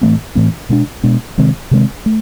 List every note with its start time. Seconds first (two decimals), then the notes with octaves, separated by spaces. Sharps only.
0.01 A2 E3 A3 C4
0.35 A2 E3 A3 C4
0.69 B2 G#3 B3 D4
1.03 B2 G#3 B3 D4
1.38 C3 D#3 G#3 C4
1.71 C3 D#3 G#3 C4
2.06 A3